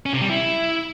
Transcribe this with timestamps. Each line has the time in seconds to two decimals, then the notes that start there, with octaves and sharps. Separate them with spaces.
0.06 C#4
0.14 C3
0.21 G3
0.29 E4